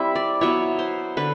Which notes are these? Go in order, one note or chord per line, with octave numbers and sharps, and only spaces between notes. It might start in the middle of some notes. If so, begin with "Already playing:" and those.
Already playing: G3 C4 E4 E5
D5
F#3 B3 E4 C#5
C5
D3 B4